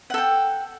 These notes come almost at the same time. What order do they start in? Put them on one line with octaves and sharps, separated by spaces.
F#5 A4 G5